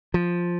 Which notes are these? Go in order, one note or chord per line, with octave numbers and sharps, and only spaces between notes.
F3